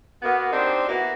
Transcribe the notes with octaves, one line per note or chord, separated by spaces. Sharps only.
B2 A#3 B3
C4 D4 D#4 G4 C5
A#3 B3 E4 F#4